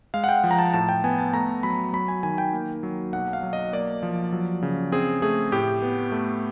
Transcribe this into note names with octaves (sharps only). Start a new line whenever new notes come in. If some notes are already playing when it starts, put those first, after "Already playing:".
G#3 F5
F#5
G5
F3
A#5
A5
A2 A5
G5
B3 G#5
A5
A3 A#5
F#3 B5
F#3 B5
G#5
D#3 G#5
G5
A#3
F#3
B1 F#5
F5
F#3
D#5
A#3 D5
F3
F#3
C#3
C4 G#4
A3 G#4
A2 G4
B3
A3